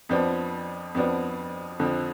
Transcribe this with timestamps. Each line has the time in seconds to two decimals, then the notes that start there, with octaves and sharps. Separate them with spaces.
0.09 F2 F3 B3 D4
0.95 F2 F3 B3 D4
1.80 F2 D3 F3